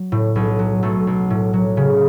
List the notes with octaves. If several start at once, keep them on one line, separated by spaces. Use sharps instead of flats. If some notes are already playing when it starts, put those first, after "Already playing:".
Already playing: F#3
A2
B1
F#3
B1 A3
B1
A2
F#3
C#3